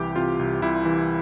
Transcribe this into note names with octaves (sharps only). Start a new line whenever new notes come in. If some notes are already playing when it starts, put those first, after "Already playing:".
Already playing: C2 E3 G4
C3 F4
C2
C2 E4
E3